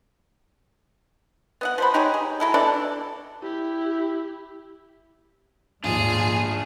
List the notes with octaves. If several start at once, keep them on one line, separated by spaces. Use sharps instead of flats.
B3 D#5 F#5
F3 C5 B5
D#4 G4 G#4 C#5
G#4
F#3 E4 A4
B2 D4 A4 D5
E4 G4
A#1 D#2 G#2 D4 F4 G#4